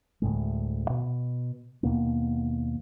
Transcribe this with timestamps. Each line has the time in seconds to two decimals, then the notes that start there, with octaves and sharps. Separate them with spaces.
0.22 D2 A2 G#3
0.90 B2
1.83 D#2 B2 A#3 B3